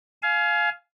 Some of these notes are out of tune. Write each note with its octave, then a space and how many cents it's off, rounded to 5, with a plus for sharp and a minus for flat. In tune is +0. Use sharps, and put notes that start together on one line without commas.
F5 +0 G#5 +30